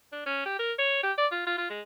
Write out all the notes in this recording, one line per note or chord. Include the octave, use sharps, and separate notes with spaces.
D4
C#4
G4
A#4
C#5
G4
D5
F4
F4
F4
G#3